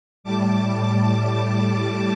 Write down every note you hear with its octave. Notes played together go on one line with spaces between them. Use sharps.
A2 G3 A5 D6
A5 D6